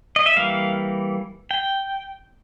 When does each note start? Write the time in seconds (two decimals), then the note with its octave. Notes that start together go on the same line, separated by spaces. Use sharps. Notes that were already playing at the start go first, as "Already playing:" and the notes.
0.16 D#5
0.26 E5
0.36 E3 G3 A#3 F5
1.51 G5